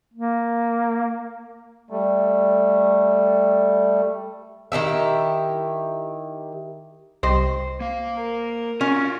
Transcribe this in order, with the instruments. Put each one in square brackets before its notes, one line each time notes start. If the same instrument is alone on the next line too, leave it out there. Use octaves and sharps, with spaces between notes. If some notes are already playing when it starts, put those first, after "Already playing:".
[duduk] A#3
[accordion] G3 A3
[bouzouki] D#3 E4 G4 E5
[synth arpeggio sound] C2 G4 D#5 [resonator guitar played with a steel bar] C5
[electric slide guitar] A#3 F5
[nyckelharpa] A#4
[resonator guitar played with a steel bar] C#4 [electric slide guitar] F4 F#4